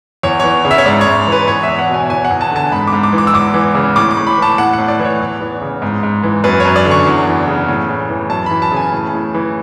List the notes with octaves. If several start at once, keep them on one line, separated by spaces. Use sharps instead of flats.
E2 C#5
E3 C#5
C#3
E5
C#5
G#2 D5
C#5
G#2
E3 B4
E2 C#5
E5
E2
F#5
B2 G#5
E2 G#5
F#5
E2
A5
D3 A5
G#2 B5
D6
G#2
D6
E3
D6
E6
E2 D6
E3
C#3
A2 D6
D6
A2
B5
E3 A5
A2 F#5
A2 F#5
D5
E3
C#5
E2
E3
C#3
G#2
G#2
E3
F#2 B4
C#5
F#2
D5
D3
C#6
E2
E3
C#3
A2
A2
E3
F#2 A5
E3 B5
A5
C#3 G#5
A2
A2
E3